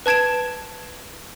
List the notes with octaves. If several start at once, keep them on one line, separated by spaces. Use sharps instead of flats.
B4 A5 G#6 D7 E7